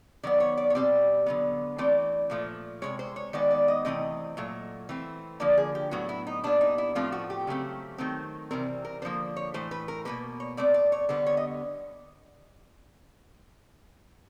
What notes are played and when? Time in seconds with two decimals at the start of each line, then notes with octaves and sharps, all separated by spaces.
0.23 D#3 F#3 B3 D5
0.40 C#5
0.57 D5
0.70 C#5
0.75 B2 G3 C4 D5
1.26 D3 F#3 B3
1.78 E3 A3 C4 D5
2.30 A#2 F3 A3
2.82 C3 E3 G#3 C#5
2.99 C5
3.16 C#5
3.33 D#3 G#3 B3 D5
3.51 D5
3.68 D#5
3.85 C3 E3 A3 C4 D#5
4.37 A#2 F#3 A3
4.89 E3 A3 C4
5.40 D3 F3 A#3 D5
5.58 G#4
5.75 G4
5.91 A2 F#3 B3 F#4
6.09 E4
6.27 D#4
6.44 A#2 G3 B3 D4
6.61 D#4
6.78 E4
6.95 A2 F3 A3 C4 F4
7.12 F#4
7.30 G4
7.47 C#3 F#3 A3 C4
7.98 D#3 F#3 A3 C4
8.51 C3 E3 G3 C4 A#4
8.85 A#4
9.02 D3 F3 A#3 C5
9.36 C#5
9.54 A2 E3 A3 C5
9.71 B4
9.88 A#4
10.05 B2 F#3 A#3 B4
10.40 C#5
10.57 A2 F#3 A3 C4 D5
10.74 D5
10.92 C#5
11.09 D3 G3 B3 C5
11.26 C#5
11.37 D#5